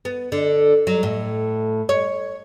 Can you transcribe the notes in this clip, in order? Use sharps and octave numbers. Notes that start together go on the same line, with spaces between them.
B3
D3
F#3
A2
C#5